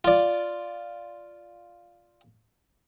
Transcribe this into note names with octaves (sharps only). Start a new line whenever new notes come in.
F4 D5